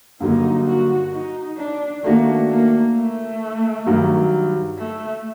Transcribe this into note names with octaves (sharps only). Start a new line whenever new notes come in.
G2 D3 F#3 A#3 D#4
F#4
D#4
D4
D#3 A3 A#3 D4 F#4
A#3
A3
G2 D#3 F#3
A3